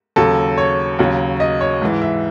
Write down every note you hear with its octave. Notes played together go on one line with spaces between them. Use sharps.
D#2 C#3 F#3 A4
C#5
D#2 C#3 F#3
D#5
C#5
G#2 E3
E5